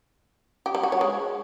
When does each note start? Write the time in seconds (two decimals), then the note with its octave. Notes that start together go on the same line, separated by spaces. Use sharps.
0.66 G4
0.75 G3
0.83 F#4
0.92 C#5
1.01 G#3